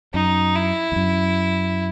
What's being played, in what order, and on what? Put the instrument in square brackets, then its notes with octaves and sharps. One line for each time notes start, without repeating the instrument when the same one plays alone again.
[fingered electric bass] F#2 [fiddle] D#4
[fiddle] E4
[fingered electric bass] E2
F#2